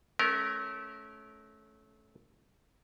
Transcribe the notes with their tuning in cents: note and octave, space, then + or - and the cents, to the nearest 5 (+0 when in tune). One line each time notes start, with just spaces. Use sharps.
A3 -25 C#4 +0 A#4 +0